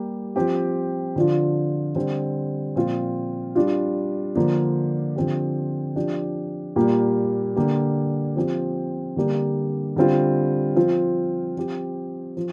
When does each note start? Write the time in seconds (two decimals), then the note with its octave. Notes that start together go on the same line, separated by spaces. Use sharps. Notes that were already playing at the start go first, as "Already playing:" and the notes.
Already playing: G3 A#3 G4
0.36 F3 C4 G4
1.16 D3 F3 D4 F4
1.95 D3 G3 C4
2.76 A#2 F3 C4 F4
3.55 G3 D4 F4
4.35 D3 F3 A#3 D4
5.16 D3 F3 C4 G4
5.96 F3 D4 G4
6.76 A#2 G3 A#3 G4
7.56 D3 A#3 G4
8.36 F3 C4 G4
9.16 D3 G3 A#3 D4 G4
9.96 D3 G3 C4 F4
10.76 F3 C4 F4
11.57 F3 C4 G4
12.37 F3